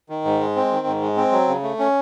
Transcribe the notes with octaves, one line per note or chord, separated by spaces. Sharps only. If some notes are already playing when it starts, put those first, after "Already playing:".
D#3
G#2
G#3
C4
D#3
G#2
G#3
C4
F#3
C#3
A3
C#4